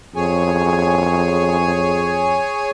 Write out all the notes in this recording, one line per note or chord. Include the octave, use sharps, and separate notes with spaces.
F2 G#4 C#5 G#5